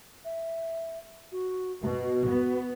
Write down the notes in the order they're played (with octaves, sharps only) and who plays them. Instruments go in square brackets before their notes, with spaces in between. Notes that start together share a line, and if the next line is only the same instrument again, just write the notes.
[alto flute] E5
F#4
[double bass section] B2 [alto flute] F#4
[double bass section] B3